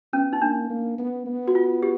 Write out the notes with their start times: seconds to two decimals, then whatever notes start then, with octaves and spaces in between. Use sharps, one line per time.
0.13 B3 C#4
0.33 D#4
0.41 A#3 D4
0.70 A#3
0.99 B3
1.26 B3
1.48 F#4
1.55 F4
1.83 G4